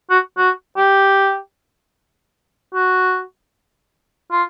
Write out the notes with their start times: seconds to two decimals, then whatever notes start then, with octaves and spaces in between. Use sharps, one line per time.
0.10 F#4
0.38 F#4
0.77 G4
2.74 F#4
4.31 F4